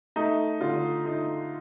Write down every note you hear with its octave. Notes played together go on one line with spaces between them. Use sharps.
A3 D#4
D3 F4
A3 D#4